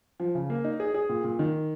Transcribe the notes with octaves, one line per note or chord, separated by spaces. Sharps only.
F3
C#3
A#3
D#4
G#4
G#4
A#2
A#2
D#3